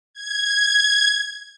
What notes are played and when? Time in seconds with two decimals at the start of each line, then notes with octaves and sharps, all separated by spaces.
0.14 G#6